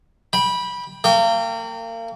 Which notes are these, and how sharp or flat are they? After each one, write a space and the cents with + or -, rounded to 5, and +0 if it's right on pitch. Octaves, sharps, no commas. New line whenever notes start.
G5 +15 B5 -15
A#3 -35 G5 +0